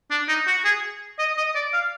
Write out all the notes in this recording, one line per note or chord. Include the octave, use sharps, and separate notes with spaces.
D4
D#4
F#4
G#4
D#5
D#5
D5
F5